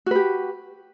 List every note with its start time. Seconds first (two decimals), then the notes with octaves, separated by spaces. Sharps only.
0.06 F#4
0.11 B4
0.15 G4